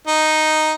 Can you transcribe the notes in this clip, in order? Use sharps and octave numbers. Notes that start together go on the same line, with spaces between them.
D#4